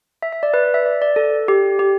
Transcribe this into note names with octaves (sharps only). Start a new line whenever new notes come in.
E5
E5
D5
B4
D5
E5
D5
D5
A4
G4
G4